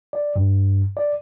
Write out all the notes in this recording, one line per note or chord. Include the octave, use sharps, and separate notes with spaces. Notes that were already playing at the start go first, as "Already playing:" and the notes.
D5
G2
D5